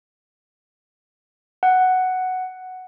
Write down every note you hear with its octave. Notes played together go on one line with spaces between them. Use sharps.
F#5